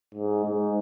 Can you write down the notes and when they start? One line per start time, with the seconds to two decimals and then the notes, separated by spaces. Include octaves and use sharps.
0.15 G#2
0.45 G#2